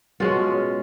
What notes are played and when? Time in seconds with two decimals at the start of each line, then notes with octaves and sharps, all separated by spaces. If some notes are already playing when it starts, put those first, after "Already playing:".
0.20 B2 G#3 C#4 F4